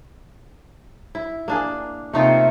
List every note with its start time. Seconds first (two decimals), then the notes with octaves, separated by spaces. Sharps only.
1.15 E4
1.48 A#3 D4 G#4
2.13 C3 A3 A#3 D#4 F4 E5